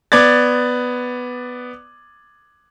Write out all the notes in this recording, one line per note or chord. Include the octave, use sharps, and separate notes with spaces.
B3 D5 G#6 A6